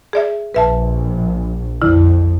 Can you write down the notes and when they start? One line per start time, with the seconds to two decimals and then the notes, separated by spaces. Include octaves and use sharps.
0.13 G#4 D5 E5
0.54 A#1 B4 E5 A5
1.82 F2 D3 E4